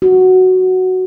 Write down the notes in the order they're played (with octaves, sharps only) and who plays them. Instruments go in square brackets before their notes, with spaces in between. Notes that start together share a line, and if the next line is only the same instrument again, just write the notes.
[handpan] F#4